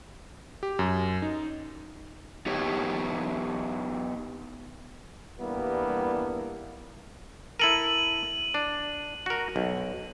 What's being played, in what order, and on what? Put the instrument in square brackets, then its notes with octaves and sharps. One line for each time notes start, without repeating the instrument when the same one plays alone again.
[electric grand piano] G4
F#2
D#4
[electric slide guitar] B3 D#4 G4 C#5
[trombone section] E2 G2 G3 A#3 B3 E4
[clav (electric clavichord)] E4 A4 A#4 [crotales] D#7 F#7
[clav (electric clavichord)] D4
F#4 A#4
B1